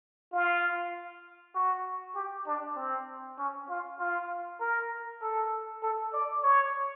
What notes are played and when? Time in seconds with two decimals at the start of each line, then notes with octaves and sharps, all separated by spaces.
0.32 F4
1.55 F#4
2.15 G4
2.46 D4
2.76 C4
3.38 C#4
3.69 F4
3.99 F4
4.60 A#4
5.22 A4
5.82 A4
6.13 D5
6.43 C#5